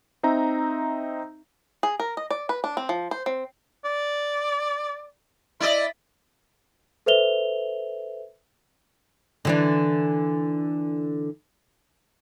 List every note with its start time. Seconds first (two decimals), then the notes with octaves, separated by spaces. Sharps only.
0.23 C4 D#4 E5 A#5
1.83 G#4
2.00 A#4
2.17 D#5
2.31 D5
2.49 B4
2.64 D4
2.77 C4
2.89 F3
3.11 C5
3.26 C4
3.85 D5
5.60 E4 D5 D#5 B5
7.06 A4 B4 C5 E5 F7 G7
9.45 D3 E3 D4